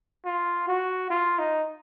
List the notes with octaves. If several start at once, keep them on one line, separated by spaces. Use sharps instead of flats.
F4
F#4
F4
D#4